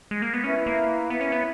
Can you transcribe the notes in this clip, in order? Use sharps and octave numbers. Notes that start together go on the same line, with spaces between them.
G#3
A#3
B3
C#4 E4 B4 E5 B5
A#3
B3
C#4
B3